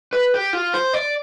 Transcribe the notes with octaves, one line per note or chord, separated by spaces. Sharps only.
B4
G4
F4
C5
D5